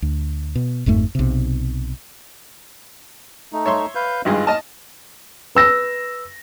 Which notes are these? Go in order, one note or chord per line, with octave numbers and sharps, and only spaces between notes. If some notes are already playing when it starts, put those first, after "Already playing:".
D2
B2
G1 F2 G#2 A3
B1 C3
A3 D#4
C#5 E5 C6
B4 F5 G6
G#1 G2 G#3 F4 F#6
D#5 A5 F6
B4 E6 A#6